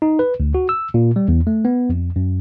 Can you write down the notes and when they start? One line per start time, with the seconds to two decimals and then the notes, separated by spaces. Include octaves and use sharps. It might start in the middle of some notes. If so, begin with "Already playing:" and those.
0.02 D#4
0.19 B4
0.40 D2
0.55 F#4
0.69 E6
0.94 A#2
1.16 G3
1.28 E2
1.47 A3
1.65 B3
1.89 F2
2.16 F#2